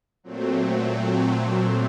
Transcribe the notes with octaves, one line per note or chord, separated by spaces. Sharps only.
A#2 F#3 A3 C4